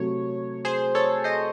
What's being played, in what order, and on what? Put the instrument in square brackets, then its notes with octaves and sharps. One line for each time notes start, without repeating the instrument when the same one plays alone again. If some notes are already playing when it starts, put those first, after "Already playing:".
Already playing: [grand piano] C3 F#3 A3 [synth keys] C#5
[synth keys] G#4 C5
A4 C#5
C5 D#5